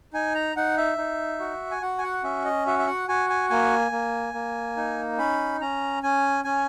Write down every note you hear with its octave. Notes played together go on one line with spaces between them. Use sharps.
D#4 G#5
A#5
D#4 F#5
E5
D#4
F#4
G#5
F#4 F#5
G#5
F#5
C#4 E5
D#5
F#4 E5
E5
F#5
F#4 G#5
G#5
A#3 G#5
A#3
A#3
D#4
C#4 B5
C#4 A#5
C#4 G#5
C#4 G#5